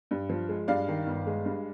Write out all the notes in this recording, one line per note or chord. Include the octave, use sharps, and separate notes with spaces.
G2
F3
G#3
G2 D5 F5
D#3
G1
G#3
G2